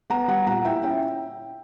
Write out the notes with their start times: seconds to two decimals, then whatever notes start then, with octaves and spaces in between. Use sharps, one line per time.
0.10 B3 F#5 A#5
0.28 G3 F#5 A#5
0.47 A#2 F#5 A#5
0.65 E4 E5 G5
0.83 C#4 E5 G5